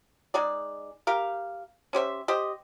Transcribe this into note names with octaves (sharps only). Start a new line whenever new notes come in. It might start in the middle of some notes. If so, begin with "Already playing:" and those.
G#3 D#4 G#4 D5
G4 A#4 F5
C#4 G4 C5 E5
G4 C5 D#5